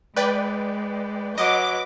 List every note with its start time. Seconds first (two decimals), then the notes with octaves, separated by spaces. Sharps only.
0.16 G#3 B4 D5 G5
1.38 F#3 B4 D#5 D6